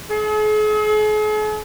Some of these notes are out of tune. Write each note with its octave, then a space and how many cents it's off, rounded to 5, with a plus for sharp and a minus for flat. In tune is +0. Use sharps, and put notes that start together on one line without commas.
G#4 +45